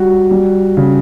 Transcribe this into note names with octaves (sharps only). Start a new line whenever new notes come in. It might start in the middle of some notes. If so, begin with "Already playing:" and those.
Already playing: G3 F#4
G3
C#3